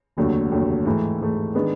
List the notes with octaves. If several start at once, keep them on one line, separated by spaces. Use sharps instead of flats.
F1 D#2 D3 F#3 A3
F1 D#2 D3 F#3 A3
G#2 E3 A3
G#2 E3 A3
D#3 G#3 B3 D4